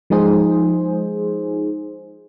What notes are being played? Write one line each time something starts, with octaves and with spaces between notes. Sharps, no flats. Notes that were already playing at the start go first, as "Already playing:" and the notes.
F3 G#3 D#4 G#4 C5